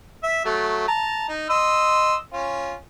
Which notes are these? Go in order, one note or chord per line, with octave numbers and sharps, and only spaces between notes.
E5
F#3 A3
A5 A#5
D#4
D#5 C6 E6
C#4 F4